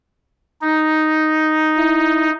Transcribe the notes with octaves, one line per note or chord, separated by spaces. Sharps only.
D#4
E4